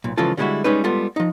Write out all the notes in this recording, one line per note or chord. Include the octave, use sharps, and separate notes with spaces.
B1 A#2
C#3 E3 F3 G#3 F4 A4
D3 G3 G#3 D#4 E4 F#4
G3 G#3 C#4 D#4 B4
G3 G#3 B3 F4 A4
F3 D#4